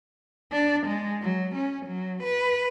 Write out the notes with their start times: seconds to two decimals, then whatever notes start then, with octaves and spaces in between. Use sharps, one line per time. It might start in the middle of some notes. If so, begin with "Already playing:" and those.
0.52 D4
0.87 G#3
1.22 F#3
1.55 C#4
1.87 F#3
2.23 B4